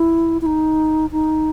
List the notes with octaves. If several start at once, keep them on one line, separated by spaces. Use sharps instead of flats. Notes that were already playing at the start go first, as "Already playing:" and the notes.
Already playing: E4
E4
D#4
D#4